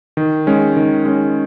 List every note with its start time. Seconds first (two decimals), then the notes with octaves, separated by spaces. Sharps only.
0.17 D#3
0.47 G#3 C#4
0.77 D#3
1.05 G#3 C#4